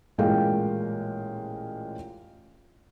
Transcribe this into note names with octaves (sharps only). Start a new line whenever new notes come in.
A1 A#2 G#3 A#3 F5 G5